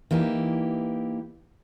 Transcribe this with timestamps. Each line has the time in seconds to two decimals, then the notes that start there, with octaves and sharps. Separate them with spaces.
0.11 E3 A#3 D#4 G4